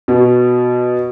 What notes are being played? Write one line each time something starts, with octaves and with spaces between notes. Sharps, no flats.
B2